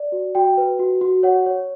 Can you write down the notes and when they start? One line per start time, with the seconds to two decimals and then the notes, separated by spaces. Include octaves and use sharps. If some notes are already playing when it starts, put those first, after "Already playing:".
Already playing: D5
0.12 F#4
0.35 F#4 G5
0.57 B4
0.79 F#4
1.01 F#4
1.23 C#5 F#5
1.46 C#5